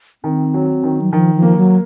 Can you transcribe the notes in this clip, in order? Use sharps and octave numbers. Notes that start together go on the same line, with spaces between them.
D#3 C4
F#3
D#3
F#3
D#3 F3
F3
A#3
F#3